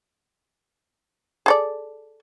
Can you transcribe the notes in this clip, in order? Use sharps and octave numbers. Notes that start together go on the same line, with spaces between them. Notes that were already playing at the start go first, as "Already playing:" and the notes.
G#4 A4 D5